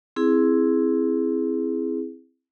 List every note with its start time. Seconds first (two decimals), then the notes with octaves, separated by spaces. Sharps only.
0.16 C4 E4 G#4